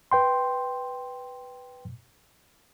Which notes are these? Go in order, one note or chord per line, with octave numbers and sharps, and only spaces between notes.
B4 G5 C6